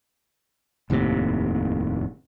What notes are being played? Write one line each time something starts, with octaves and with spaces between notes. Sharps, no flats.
F1 D#2 A2 C3